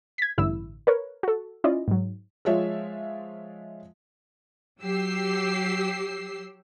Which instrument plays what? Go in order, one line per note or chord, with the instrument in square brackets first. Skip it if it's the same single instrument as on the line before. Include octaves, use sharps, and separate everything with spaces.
[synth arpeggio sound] G#6 B6
A1 G2 D3 E4 E6
A#4 B4 C#5
F#4 A4
C#4 E4 F4 D5 D#5
G#2 F#3
[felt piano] F3 G#3 F4 C#5 E5
[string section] F#3 G4 E6 C7